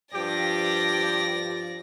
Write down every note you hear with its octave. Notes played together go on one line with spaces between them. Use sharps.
G2 F3 G4 D5 A#6